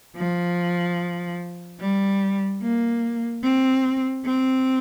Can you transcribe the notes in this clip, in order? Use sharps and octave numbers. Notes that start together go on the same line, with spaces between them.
F3
G3
A#3
C4
C4